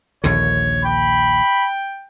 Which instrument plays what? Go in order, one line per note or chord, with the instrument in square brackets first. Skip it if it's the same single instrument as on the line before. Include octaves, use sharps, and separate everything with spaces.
[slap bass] A#1 D#2 D3 [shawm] C#5
[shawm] G5 [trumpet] B5